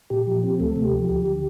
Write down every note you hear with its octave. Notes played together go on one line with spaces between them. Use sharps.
A#2 G4
F3
C4
D2 A3 A4
C3
G4
F3
D2 G4
D3